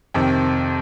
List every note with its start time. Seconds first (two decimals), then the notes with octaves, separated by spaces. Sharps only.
0.14 F2 C3 D#3